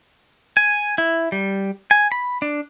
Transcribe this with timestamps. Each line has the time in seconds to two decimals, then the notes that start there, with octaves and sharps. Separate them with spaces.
0.57 G#5
0.98 E4
1.32 G3
1.91 G#5
2.12 B5
2.42 D4